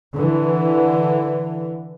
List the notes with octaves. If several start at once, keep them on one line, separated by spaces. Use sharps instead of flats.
D3 E3